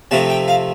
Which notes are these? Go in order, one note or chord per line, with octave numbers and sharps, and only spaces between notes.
C3 F3 A3 C4 A5
G5
F5